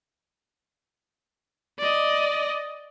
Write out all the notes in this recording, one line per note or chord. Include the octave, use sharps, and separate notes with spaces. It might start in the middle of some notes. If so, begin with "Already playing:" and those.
D5 D#5